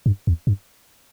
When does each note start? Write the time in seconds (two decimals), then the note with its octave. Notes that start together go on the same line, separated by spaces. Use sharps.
0.06 G2
0.27 E2
0.47 G2